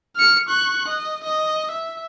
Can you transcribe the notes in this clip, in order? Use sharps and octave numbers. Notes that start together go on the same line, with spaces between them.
F6 C#7
C#6 F#6
D#5
D#5
E5